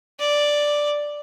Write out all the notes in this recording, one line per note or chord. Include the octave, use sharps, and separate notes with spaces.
D5